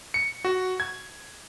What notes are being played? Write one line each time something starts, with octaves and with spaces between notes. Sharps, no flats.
C#7
F#4
G#6